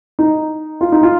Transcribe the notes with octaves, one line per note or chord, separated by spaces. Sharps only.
D#4
F4
D#4
F4